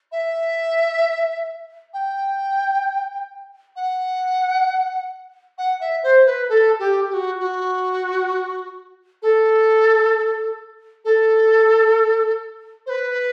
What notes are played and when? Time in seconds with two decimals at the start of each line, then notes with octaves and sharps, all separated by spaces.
0.12 E5
1.93 G5
3.76 F#5
5.58 F#5
5.80 E5
6.03 C5
6.26 B4
6.49 A4
6.79 G4
7.09 G4
7.14 F#4
7.40 F#4
9.22 A4
11.04 A4
12.86 C5
12.89 B4